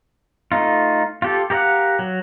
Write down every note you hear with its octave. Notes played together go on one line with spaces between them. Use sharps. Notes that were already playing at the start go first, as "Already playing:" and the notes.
A3 D#4 F4
F4 G4 A4
G4 A#4 D#5 F5 F#5
F#3